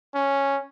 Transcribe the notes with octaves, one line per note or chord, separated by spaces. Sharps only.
C#4